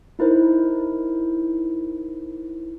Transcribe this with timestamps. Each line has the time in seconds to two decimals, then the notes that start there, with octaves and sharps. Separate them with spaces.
0.19 D#4 E4 A#4 C5